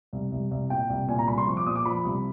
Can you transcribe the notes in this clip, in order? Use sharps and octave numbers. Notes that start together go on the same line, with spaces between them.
C2
C2
C2
A#2 G5
C2
A#2 G#5
A#5
C2 B5
C6
F3 C#6
D6
A#2 D#6
D6
F3 B5
C2